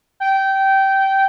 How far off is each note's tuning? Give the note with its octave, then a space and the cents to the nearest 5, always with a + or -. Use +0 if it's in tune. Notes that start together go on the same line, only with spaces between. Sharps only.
G5 -15